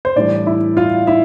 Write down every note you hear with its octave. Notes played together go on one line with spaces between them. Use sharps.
C5
A2 E3 G3 D4 D5
E4 E5
F4 F5
E4 E5